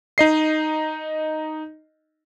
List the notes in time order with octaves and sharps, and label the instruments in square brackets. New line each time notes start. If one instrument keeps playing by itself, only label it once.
[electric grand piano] D#4 D#5 C7